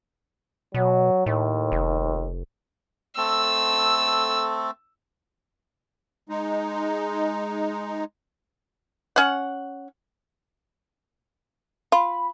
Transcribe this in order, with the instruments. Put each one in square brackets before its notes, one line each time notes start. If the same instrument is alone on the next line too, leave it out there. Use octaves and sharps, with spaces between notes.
[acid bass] B2 [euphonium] F#3
[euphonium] D#2 [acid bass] A2
[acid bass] F1
[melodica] A3 C4 A4 [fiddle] E6
[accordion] G#3 D#4
[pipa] C#4 F#5
[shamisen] F4 [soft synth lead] B5